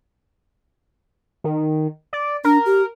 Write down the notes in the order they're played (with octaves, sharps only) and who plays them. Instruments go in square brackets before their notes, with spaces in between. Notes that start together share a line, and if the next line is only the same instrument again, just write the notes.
[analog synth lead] D#3
D5
[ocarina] D4 [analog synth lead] A#4
[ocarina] G4